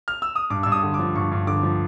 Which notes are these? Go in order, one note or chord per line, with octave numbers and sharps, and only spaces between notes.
F6
E6
D#6
G2 D6
G2 E6
D#6
D3
D6
F3
G2 C#6
G2
D3 D6
F3